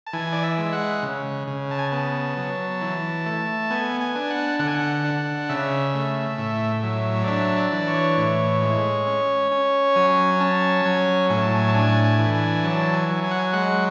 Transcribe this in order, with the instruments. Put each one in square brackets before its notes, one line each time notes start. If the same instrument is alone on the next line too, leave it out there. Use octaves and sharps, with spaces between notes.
[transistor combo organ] A5
E3 G#5
D5
E5
G#3
F#5
C#3
C#3
A5
G#5
B3 A5
F#3
E3
A3
B3 G#5
G#5
D4
F#5
D3 F#5
G#5
F#5
D4
C#3 E5
A3
A2
F#3
D5
D4 E5
D5
E3
C#5
A2
G#3
C#4
C#4
F#3 G#5
C#4 A5
F#3 G#5
A2 G#5
A5
G#5
A5
D4 G#5
G#5
E3
G#5
F#3 A5
G#5
F#3
G#5
F#5
G#5
G#3 F#5